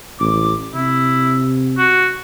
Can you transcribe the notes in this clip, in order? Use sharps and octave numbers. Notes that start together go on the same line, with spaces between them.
A1 D6
C3 E4
F#4